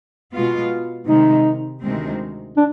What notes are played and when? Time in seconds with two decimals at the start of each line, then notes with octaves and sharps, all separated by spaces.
0.33 B2 G#3 B3 F4
1.07 C3 D#3 G#3 D#4
1.82 D2 C3 D#3 G#3 C4
2.57 D4